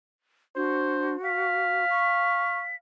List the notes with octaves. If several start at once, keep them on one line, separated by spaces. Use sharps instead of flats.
D4 F#4 C5
F5 B6
C#6